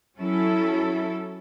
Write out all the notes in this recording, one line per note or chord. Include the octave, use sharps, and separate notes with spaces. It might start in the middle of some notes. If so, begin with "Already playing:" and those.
F#3 C#4 E4 A4